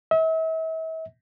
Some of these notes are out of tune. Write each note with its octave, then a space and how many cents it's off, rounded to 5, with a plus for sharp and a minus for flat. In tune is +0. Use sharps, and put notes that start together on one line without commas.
E5 -40